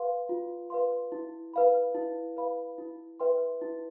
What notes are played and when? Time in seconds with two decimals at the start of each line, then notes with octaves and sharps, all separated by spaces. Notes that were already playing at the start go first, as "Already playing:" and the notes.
Already playing: B4 F5 C6
0.29 F4
0.70 B4 F5 C6
1.12 E4
1.54 B4 F5 B5
1.95 E4
2.37 B4 F5 B5
2.78 E4
3.20 B4 E5 G5 C6
3.61 E4